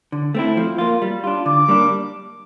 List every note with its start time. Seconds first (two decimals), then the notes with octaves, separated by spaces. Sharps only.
0.12 D3
0.35 A3 C4 E4
0.57 F3
0.78 A#3 F4
1.02 G3
1.24 D4 F4
1.46 D3 D6
1.68 G3 A#3 D4